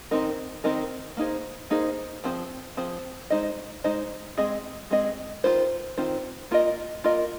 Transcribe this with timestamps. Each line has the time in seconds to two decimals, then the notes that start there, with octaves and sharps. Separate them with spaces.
0.11 D#3 C4 D#4 A#4
0.64 D#3 C4 D#4 A#4
1.17 A#3 D#4 G#4 C5
1.70 A#3 D#4 G#4 C5
2.24 F3 C4 G#4 C5
2.77 F3 C4 G#4 C5
3.30 G#3 D#4 C5 D#5
3.84 G#3 D#4 C5 D#5
4.38 G#3 C4 G#4 D#5
4.91 G#3 C4 G#4 D#5
5.44 D#3 C4 F4 C5
5.98 D#3 C4 F4 C5
6.51 A#3 F4 A#4 D#5
7.04 A#3 F4 A#4 D#5